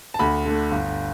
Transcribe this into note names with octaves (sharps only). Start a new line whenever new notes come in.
A5
D2 B5
D3 A3
G1